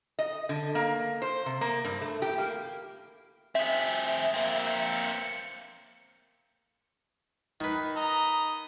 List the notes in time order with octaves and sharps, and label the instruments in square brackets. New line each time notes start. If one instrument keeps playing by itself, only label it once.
[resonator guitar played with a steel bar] D#5
D3
A#3
C5
C3
A#3
G2
A3
G4
A#3
[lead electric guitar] C4 G#4 [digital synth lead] E5
[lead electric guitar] A#3 C4
[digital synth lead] C#7
[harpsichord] D#3 B4
[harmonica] D#5 A#5